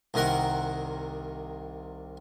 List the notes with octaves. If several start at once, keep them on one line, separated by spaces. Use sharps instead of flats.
C2 C3 D#3 A#4 F#5